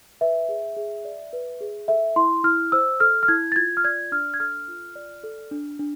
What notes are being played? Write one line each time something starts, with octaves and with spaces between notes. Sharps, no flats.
B4 E5
G#4
G#4
D5
B4
G#4
A4 E5
E4 C6
E4 F6
C5 E6
A4 F6
F6
E4 G#6
A6
F4 G#6
F6
D5 G#6
D4 F6
G#6
A4 F6
F4
D5
A4
D4
D4